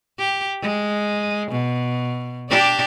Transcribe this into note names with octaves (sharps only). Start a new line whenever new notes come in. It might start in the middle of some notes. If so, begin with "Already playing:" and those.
G4
G#3
B2
D4 G4 D5